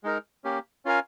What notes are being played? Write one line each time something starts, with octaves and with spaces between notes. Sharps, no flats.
G#3 D#4 A#4
A#3 C#4 G4
C#4 F4 A#4 F5 G#5